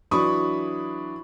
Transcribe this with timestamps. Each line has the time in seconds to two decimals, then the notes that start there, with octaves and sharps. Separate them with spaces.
0.11 E3 F#3 D4 B5 C#6 D#6